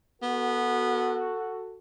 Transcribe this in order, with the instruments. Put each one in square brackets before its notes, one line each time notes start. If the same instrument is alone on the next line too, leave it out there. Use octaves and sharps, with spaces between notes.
[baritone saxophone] B3 [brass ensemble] F#4 A4